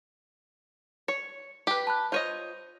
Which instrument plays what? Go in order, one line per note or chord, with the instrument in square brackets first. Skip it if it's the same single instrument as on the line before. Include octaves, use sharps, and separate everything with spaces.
[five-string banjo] C#5 [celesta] C#7
[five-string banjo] G4 B4
[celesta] A5 B5 F#6
[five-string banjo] F4 C#5 D#5 [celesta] C5 G6 D#7